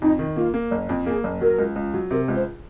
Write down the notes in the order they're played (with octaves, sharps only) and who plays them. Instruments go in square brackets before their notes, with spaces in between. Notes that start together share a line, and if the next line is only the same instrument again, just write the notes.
[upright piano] F2 [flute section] D#4
[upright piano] D#3
[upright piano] A#3 [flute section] F4
[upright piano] A#3
F#1
F2
[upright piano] A#3 [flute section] G#4
[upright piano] F#1
[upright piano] F#3 [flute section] A#4
[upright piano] C#2
C#2
F#3
[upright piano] C3 [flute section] A#4
[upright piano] C#2
[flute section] C5